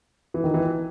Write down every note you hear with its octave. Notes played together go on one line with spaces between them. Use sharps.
E3
D#3
E3